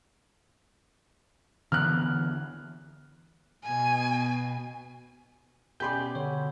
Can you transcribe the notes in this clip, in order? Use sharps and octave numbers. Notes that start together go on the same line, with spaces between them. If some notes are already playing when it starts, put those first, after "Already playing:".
D3 E3 B3 F6 F#6
B2 G#5
B2 C#4 G4 D5 G#5 B5 C6 G6
D3 C#5